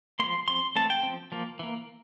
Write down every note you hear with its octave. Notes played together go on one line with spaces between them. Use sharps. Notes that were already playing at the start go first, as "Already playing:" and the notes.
F3 A#3 C6
F3 C4 C6
E3 A3 C4 A5
G5
F3 C4
F3 A#3
E3 A#3